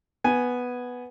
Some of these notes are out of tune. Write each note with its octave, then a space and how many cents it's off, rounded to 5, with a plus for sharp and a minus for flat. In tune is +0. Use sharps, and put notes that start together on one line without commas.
B3 +0 G#5 +0